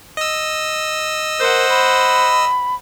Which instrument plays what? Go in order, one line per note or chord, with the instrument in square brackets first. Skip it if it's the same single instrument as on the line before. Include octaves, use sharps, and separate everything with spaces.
[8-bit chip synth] D#5 E6
[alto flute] A#4 [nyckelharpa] C5 F#5
[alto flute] B5